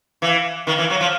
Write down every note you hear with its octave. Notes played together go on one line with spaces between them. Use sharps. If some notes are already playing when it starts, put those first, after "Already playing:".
E3
D#3
E3
F#3
F3